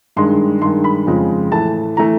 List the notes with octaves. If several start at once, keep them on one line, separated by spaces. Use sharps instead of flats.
G2 D#3 G#3 C6
G2 D#3 G#3 C6
B5
F2 C#3 F3 G#3
A2 E3 A3 A5
E3 A3 A#5